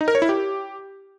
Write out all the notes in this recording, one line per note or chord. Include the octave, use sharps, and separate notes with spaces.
D#4
A#4
C#5
E4
G4